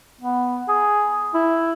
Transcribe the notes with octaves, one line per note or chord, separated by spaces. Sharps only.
B3
G#4
E4